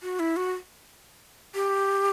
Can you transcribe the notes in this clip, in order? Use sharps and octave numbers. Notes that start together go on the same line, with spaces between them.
F#4
E4
F#4
G4